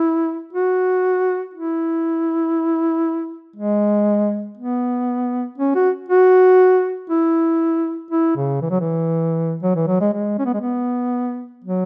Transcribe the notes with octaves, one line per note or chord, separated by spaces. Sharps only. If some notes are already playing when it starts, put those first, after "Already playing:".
Already playing: E4
F#4
E4
G#3
B3
C#4
F#4
F#4
E4
E4
C#3
E3
F#3
E3
F#3
E3
F#3
G#3
G#3
C#4
B3
G#3
B3
F#3